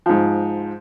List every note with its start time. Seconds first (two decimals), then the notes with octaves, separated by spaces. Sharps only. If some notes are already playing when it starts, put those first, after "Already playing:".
0.06 G#2 F3